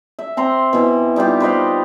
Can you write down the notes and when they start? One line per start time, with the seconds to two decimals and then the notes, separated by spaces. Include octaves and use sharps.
0.19 E5
0.37 C4 A#5 C6
0.73 B2 E3
1.16 G3 D#4 F4 G4
1.40 B4 C5 D#5 F5